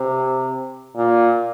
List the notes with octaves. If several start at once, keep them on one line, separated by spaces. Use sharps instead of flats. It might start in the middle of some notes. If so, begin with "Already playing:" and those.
Already playing: C3
A#2